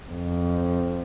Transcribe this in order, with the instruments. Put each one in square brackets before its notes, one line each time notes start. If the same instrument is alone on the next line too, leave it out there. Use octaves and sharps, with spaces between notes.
[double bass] F2